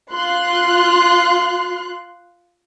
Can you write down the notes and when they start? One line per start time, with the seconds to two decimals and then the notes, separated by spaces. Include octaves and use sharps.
0.11 F4 C6 F#6